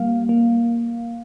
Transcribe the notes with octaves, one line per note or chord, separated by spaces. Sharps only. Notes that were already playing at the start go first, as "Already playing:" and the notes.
Already playing: G3 A#3 F5
A#3